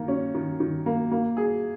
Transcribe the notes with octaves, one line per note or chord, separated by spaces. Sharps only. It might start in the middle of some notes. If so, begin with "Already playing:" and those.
Already playing: D#3 A#3
C#4
D#3
D#3
A#3
A#3
G#4